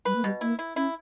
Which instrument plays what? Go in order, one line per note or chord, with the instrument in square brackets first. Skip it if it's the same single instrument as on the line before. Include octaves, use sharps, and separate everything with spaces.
[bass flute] G3 [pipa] B4
[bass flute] A#3
[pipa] B2 [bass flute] G3
[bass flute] A#3 [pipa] E4
[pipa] E4
[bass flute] C#4 [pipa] E4